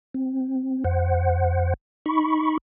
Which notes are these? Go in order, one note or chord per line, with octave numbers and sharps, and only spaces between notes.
C4
F2 C5 F#5
D#4 B5 C#6